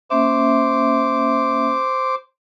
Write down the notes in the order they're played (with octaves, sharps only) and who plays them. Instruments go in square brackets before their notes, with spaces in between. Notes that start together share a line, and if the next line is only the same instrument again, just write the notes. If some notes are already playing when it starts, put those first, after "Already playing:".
[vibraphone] A#3 C#4 E5 [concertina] C5 D6